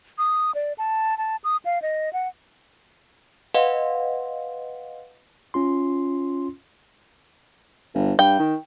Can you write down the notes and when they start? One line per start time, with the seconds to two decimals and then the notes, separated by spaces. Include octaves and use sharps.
0.18 D#6
0.55 D5
0.78 A5
1.18 A5
1.44 D#6
1.65 F5
1.82 D#5
2.13 F#5
3.54 B4 D#5 F5 F#5 C6
5.54 C#4 F4 C6
7.94 G1
8.19 G2 G5
8.39 D#3